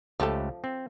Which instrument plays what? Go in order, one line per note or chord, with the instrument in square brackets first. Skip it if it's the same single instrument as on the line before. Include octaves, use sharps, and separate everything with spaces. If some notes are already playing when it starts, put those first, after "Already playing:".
[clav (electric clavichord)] C#2 A3 G4 [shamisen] F3 A4
[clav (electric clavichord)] C4